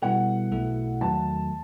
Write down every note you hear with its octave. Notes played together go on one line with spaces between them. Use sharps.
B2 G3 B3 E4 A4 F#5
B1 B2 A3 E4 A4
E2 D#3 F#3 A3 A5